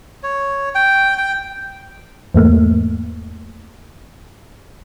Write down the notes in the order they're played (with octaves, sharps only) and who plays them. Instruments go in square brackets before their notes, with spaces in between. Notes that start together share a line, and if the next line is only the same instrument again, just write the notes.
[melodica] C#5
G5
G5
[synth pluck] E2 G#2 A3 A#3